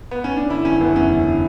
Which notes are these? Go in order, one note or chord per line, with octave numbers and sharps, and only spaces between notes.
B3
C#4
D4
D3 E4
F#1 C#4
F#1 B3
E2 C#4
D3